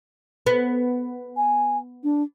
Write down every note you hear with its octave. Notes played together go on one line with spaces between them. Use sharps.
B3
G#5
D4